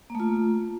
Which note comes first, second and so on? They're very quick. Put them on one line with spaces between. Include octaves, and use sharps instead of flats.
A#3 A3 F4